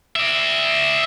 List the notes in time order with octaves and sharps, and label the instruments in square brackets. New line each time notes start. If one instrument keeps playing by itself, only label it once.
[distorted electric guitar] D5 E5